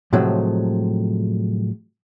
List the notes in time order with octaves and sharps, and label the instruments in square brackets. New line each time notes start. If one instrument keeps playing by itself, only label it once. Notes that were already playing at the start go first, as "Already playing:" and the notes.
[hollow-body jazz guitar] A2 C3 F3 F#3 G#3 A3